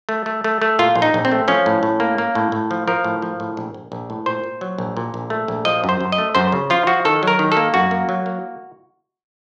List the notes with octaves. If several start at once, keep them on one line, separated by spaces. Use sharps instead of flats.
A3
A3
A3
A3
A#2 F4
A#1
D#4
A#1
C4
A3
F3 C#4
A2
A2
A#3
A#3
A2
A2
F3
F3 A#4
A2
F3
A2
A#1
A#1
A#1
A2
A#2 C5
A#2
F#3
A#1
A#2
A#1
A3
A#1
F3 D#5
F#2
C5
F#2
D#5
A3
F#2 C5
C#3
F3 F4
F3 F#4
D#3 A4
F#3 A#4
D#3
A4
A#3
F#2 F#4
A#3
F#3
A#3